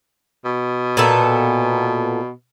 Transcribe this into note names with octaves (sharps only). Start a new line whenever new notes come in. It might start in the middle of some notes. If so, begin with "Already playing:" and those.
B2
A#2 B3 A4